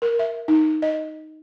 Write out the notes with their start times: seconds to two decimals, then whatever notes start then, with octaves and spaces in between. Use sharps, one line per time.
0.02 A#4
0.19 E5
0.48 D#4
0.82 D#5